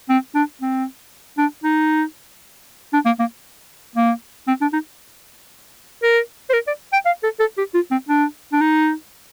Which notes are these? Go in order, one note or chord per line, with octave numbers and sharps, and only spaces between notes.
C4
D4
C4
D4
D#4
D4
A#3
A#3
A#3
C4
D4
D#4
A#4
C5
A#4
D5
G5
F5
A4
A4
G4
F4
C4
D4
D4
D#4